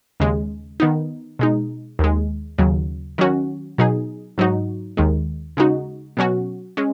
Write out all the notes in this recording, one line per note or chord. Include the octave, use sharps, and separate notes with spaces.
D#2 C#3 G#3
D#3 B3 D#4
B2 G#3 D#4
D#2 D#3 G#3
D#2 C#3 F#3
D#3 F#3 C#4 F#4
B2 F#3 D#4 G#4
G#2 F#3 D#4 F#4
D#2 D#3 G#3
C#3 G#3 D#4 F#4
B2 F#3 C#4 F#4
G#3 C#4